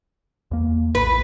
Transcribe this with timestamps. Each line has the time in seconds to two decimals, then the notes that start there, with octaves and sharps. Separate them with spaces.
0.51 E2 A#3
0.95 A#1 A2 B4